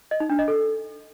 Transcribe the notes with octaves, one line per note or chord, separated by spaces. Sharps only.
D#5
D#4
D4
D#5
A4